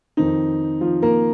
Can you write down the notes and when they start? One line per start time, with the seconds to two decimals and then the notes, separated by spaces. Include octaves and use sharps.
0.17 F2 D#3 C4 D#4
0.81 F3 F4
1.02 A#3 A#4